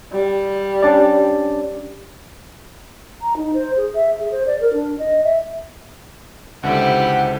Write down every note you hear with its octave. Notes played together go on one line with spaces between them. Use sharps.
G3
C#4 D4 D5
A#5
D#4
C5
G#4
E5
G#4
C5
D5
A#4
D4
D#5
E5
C#2 D3 E4 G4 C5 F#5